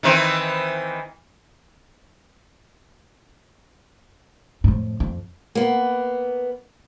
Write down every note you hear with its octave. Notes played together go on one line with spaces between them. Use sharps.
D#3 E3 C4
F2 A2
F2
A#3 B3